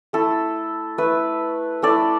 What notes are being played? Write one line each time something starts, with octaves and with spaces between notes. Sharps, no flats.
A3 E4 A4
A3 E4 B4 E5
A3 E4 A4 D5